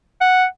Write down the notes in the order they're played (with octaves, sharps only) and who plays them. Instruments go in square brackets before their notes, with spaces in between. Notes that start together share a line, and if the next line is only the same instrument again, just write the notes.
[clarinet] F#5